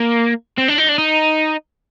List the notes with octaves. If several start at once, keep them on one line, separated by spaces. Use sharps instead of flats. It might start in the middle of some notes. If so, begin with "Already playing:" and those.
Already playing: A#3
C4
D4
D#4
D4
D#4